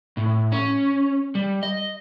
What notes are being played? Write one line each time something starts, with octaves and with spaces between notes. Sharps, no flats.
A2
C#4
G3
D#5